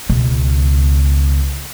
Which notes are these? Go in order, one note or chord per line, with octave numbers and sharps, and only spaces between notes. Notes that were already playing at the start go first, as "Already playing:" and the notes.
C#2 B2